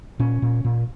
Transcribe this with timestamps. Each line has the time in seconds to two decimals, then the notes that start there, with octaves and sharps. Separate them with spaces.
0.19 A#2 C#4
0.42 A#2
0.65 A#2